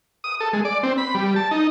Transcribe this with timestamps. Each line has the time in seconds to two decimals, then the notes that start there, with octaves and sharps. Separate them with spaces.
0.24 D#6
0.40 A4
0.53 G#3
0.65 D5
0.83 C4
0.98 B5
1.15 G3
1.36 A5
1.51 D#4